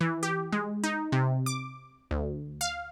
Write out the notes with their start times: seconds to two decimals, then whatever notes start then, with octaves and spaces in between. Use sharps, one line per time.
0.01 E3
0.23 G4
0.52 G#3
0.84 D#4
1.12 C3
1.46 D6
2.11 D2
2.61 F5